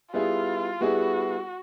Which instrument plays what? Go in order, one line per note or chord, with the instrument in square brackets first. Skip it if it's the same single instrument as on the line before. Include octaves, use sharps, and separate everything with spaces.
[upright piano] G3 B3 E4 G#4 [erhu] F4
[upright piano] G3 B3 E4 G#4 [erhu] F#4